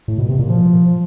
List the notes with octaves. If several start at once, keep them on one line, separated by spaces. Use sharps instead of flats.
A2
B2
C3
A#2
F3